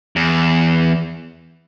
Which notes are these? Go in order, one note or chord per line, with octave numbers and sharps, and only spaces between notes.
E2